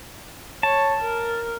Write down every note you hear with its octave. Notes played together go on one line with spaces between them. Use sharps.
C#5 A5
A#4